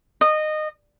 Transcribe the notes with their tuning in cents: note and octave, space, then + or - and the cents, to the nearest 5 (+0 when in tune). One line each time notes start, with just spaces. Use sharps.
D#5 -20